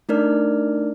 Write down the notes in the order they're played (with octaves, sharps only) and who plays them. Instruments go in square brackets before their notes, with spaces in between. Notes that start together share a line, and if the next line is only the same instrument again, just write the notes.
[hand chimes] A3 D4 D#4 A#4 D5 F6